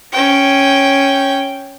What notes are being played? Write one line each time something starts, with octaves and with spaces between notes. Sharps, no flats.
C#4 G5